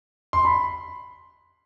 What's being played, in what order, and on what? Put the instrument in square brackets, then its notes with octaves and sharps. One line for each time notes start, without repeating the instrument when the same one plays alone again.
[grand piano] C6
B5